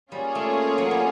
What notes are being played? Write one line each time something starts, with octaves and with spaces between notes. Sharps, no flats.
G3 A#3 C#4 F4 G#4 C#5
A3
F#3
G3